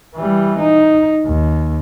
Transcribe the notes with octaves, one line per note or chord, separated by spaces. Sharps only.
E3 G3
D#4
D#2